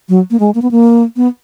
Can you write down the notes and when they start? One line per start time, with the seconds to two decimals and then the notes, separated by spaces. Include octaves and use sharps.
0.09 F#3
0.31 A#3
0.40 G#3
0.55 A#3
0.62 B3
0.71 A#3
1.17 B3